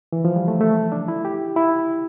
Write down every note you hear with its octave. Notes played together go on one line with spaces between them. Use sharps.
E3
F3
G3
A3
A3
D4
E4
G4
E4